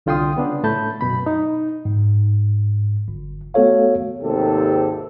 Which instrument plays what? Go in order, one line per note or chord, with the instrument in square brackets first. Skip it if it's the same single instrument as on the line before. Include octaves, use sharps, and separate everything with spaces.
[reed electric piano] C2 D3 F4 G5 C6 D#6
C#3 B3 D4
A2 A3 A5 B5 G6
F#2 B2 B5
D#4
[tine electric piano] G#2
G1
A3 B3 F#4 A4 C#5 F5
[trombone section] G#1 D#2 G#2 C3 G4 A4